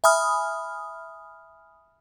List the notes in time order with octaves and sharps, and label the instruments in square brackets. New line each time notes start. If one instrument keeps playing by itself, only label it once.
[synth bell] E5 G#5 B5 D#6 F6